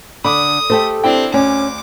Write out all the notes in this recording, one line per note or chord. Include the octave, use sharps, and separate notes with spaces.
D3 B5 D6 D#6
A3 G4 A4 C5
C4 D4 E4 G5
D2 C#4 D6